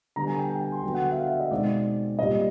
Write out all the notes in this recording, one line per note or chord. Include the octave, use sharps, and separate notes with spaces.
D3 G3 B3 A#5
G#5
G5
G5
G#5
C6
D3 F#3 B3 G5
F#5
F#5
E5
F5
E5
D#5
B2 G#3 C4 D#4 D5
A#2 G3 C4 D#5